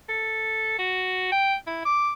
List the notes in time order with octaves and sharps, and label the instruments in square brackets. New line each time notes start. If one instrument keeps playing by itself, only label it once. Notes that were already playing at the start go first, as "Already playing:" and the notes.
[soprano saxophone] A4
F#4
G5
E4
D6